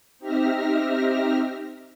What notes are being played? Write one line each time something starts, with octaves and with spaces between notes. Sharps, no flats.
C4 D#4 G4 E5 F6 A#6